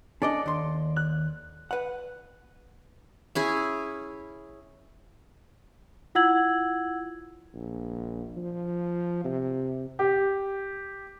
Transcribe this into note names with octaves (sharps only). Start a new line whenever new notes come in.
C#4 D4 A4 D5 D#5
D#2 C6
F#6
B4 F#5
C#4 E4 G#4
E4 F4 F#5 E6 G#6 F#7
A#1
F3
C3
G4